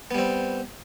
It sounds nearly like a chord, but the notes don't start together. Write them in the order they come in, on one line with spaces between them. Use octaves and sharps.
B3 G3 C4